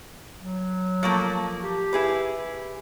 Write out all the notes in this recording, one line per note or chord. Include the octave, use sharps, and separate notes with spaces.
F#3
F3 A3 A#3
G4
E4 G#4 B4